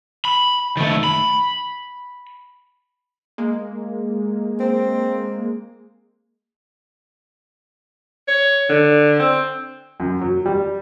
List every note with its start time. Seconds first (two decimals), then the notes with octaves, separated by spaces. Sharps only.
0.25 B5
0.77 D#3 A3
1.04 B5
3.38 G#3 A#3
4.60 C4
8.28 C#5
8.69 D3
9.19 C4
10.00 F#2
10.21 F#3
10.46 G3